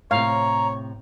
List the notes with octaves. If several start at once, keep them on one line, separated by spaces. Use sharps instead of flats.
A2 C3 C#5 F5 A#5